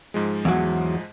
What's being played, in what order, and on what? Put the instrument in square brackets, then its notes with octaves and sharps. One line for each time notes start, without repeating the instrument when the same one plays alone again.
[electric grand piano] G#2 F3 G#3
[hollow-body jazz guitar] E2 F#3